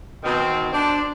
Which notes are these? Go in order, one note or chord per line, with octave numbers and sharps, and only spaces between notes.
B2 D#3 C4
D4 C5